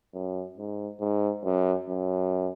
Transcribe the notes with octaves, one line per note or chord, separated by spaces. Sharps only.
F#2
G#2
G#2
F#2
F#2